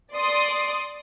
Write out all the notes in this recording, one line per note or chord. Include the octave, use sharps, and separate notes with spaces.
D5 C6 D#6